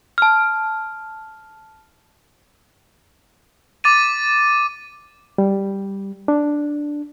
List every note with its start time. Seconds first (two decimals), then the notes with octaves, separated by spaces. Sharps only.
0.18 A5 F6
3.84 D6 A6 D#7
5.38 G3
6.28 D4